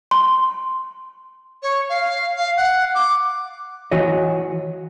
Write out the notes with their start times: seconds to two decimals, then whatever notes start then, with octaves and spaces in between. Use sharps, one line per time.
0.11 C6
1.62 C#5
1.89 F5
2.36 F5
2.57 F#5
2.94 D6
3.91 E3 F#4 C#5 D#5